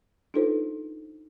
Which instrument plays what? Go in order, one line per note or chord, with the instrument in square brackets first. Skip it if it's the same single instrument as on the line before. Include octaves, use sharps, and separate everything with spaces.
[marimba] D4 D#4 F4 A4 B4 C5